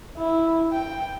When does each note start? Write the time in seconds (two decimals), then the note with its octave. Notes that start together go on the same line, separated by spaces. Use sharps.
0.17 E4
0.72 G5